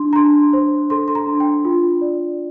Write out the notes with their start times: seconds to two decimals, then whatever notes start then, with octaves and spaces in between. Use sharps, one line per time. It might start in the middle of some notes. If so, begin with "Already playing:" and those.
Already playing: D4 C6
0.13 A#5
0.16 D4 C6
0.53 C5
0.90 A4 C6
1.08 C6
1.15 A#5
1.27 D4
1.40 G5
1.65 F4
2.01 D5